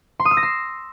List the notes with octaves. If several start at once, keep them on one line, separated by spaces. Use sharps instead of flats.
C6
D#6
E6
A#6
C7